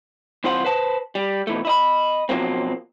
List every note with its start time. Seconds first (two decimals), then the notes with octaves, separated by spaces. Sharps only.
0.44 C2 E3 C4 F4 C5 F#5
0.65 B4 C5 A5
1.15 G3
1.47 B2 E3 A3
1.65 E4 D#5 B5
2.29 B2 F3 F#3 A#3 C4